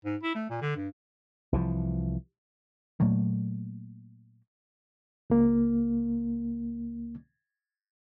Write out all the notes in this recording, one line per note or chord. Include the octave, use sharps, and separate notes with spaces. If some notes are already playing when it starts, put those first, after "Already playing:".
G#2
E4
A3
A#2
D3
G2
C2 E3 F3
A#2 F#3 A3 A#3
C#2 A#3